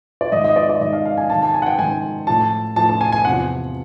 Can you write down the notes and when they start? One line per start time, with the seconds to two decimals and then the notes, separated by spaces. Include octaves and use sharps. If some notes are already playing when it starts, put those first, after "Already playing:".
0.21 D5
0.32 G#2 D#3 D#5
0.44 D#5
0.56 D5
0.69 D5
0.81 G#2 D#3 D#5
0.93 F5
1.05 F5
1.17 G#5
1.30 G#2 D#3 A5
1.42 A5
1.54 G#5
1.62 F#5
1.66 G5
1.79 G#2 D#3 G#5
2.27 A2 F3 A5
2.76 A2 F3 A5
2.89 A5
3.01 G#5
3.12 G#5
3.25 E2 C3 F3 F#5